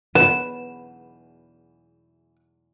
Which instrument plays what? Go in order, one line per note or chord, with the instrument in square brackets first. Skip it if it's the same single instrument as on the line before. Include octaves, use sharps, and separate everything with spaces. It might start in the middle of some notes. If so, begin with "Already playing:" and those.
[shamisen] B3 [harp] E7